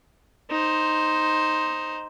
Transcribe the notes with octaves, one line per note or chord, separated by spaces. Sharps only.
D#4 C5